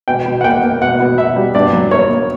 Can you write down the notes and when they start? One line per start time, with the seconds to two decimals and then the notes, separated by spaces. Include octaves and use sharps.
0.08 B2 G5
0.26 B2
0.41 F#5
0.44 A#3 G5
0.63 A#3
0.81 B2 F#5
1.00 B2
1.18 B2 E5
1.36 G3
1.55 G2 D5
1.73 F#3
1.91 A#3 C#5
2.09 A#3